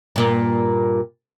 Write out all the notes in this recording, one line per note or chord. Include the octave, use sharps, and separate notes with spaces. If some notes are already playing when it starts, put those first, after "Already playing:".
G2 A#2